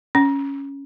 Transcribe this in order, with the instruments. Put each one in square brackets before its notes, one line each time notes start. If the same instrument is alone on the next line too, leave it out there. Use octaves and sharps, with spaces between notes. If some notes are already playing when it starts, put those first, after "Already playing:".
[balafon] C#4